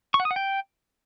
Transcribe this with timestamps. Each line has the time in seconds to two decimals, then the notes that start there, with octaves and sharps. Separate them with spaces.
0.14 C#6
0.20 F#5
0.25 D#6
0.31 F#5
0.36 G5